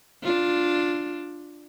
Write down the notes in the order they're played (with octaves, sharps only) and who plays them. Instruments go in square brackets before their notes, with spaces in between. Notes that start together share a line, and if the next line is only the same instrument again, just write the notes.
[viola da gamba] D4 F4